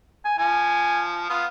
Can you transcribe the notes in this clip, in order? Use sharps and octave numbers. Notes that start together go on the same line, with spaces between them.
G#5
F3 G#5
B3 F4 F5 D#6